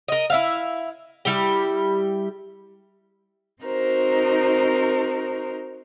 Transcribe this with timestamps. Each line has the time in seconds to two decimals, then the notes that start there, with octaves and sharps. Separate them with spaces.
0.08 A#4 D#5
0.30 E4 E5 F5
1.25 G3 E4 G4
3.63 C4 D#4 F#4 A#4 C5